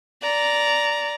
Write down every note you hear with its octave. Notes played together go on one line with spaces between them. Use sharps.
D5 A#5